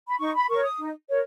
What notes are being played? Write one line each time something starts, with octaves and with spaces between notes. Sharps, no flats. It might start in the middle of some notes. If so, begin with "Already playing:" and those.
B5
D#4 C#6
B5
A#4 C#5 C#6
D#6
D#4
A#4 C#5